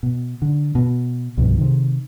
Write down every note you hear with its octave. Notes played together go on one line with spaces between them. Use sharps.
B2
D3
B2
C2 G2 B2 F3
C3 D#3